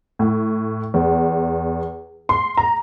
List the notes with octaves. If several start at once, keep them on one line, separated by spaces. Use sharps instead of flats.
A2
E2
C6
A#5